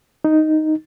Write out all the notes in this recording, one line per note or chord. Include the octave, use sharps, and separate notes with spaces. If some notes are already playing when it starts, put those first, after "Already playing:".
D#4